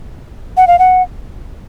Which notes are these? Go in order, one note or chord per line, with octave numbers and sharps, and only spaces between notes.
F#5
F5
F#5